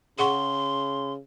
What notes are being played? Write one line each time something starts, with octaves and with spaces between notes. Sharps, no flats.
C#3 G#4 F#5 C6 C#6